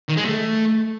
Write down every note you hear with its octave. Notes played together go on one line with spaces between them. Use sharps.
D#3
G#3
A3